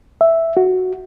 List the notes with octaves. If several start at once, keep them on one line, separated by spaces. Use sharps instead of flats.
E5
F#4